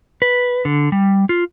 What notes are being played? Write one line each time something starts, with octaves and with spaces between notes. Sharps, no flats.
B4
D3
G3
F4